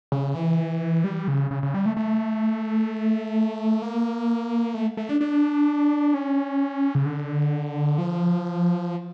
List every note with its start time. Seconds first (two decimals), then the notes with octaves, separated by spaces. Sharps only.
0.12 C#3
0.35 E3
1.04 G3
1.28 C#3
1.51 C#3
1.63 C#3
1.74 G3
1.86 A3
1.97 A3
3.82 A#3
4.74 A3
4.97 A3
5.09 D4
5.21 D4
6.14 C#4
6.95 C#3
7.06 D3
7.98 F3